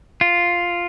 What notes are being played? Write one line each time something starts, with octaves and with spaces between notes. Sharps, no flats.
F4